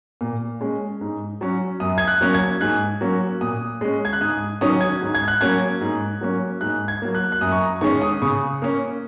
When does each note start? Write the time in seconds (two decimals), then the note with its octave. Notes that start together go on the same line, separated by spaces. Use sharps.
0.21 A#2
0.61 G#3 C#4
1.01 G#2
1.41 F#3 C#4
1.80 F#2 D#6
1.98 G#6
2.08 F#6
2.21 F#3 A#3 C#4
2.34 G#6
2.61 G#2 F#6
3.01 F#3 A#3 C#4
3.41 A#2 D#6
3.81 G#3 C#4
4.05 G#6
4.13 F#6
4.21 G#2 D#6
4.61 D#3 F#3 C#4 D#6
4.81 G#6
5.01 G#2
5.15 G#6
5.28 F#6
5.41 F#3 A#3 C#4 G#6
5.81 G#2
6.21 F#3 A#3 C#4
6.61 G#2 F#6
6.88 G#6
7.02 F#3 A#3
7.15 F#6
7.32 F#6
7.41 F#2 D#6
7.52 C#6
7.61 A#5
7.81 D#3 G#3 C#4 C#6
8.02 D#6
8.22 C#3 C#6
8.62 A#3 C#4